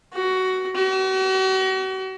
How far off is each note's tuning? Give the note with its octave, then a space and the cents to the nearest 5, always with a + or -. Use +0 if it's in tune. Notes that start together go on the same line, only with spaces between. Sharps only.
F#4 +15
F#4 +40